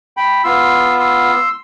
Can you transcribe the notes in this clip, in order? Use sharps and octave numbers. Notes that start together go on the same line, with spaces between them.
G5 B5
B3 F4 C6 E6
C6 E6